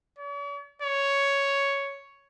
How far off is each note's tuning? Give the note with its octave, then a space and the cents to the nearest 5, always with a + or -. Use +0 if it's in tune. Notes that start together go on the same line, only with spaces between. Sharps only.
C#5 +45
C#5 +5